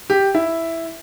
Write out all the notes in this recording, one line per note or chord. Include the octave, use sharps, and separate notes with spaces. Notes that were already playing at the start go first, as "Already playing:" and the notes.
G4
E4